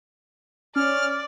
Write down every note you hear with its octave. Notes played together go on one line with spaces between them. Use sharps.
C#4 D5 F6